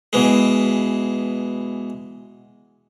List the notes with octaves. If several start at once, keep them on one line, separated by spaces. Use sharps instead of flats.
B2 E3 G#3